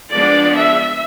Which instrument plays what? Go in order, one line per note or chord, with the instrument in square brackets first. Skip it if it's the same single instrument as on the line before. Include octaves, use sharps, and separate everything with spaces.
[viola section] F3 G#3 B3 D4 D5
E5